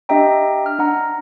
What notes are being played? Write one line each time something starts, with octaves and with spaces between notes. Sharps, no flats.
D4 G4 D#5 E5 G5 A#5
F6
D4 F#5 A#5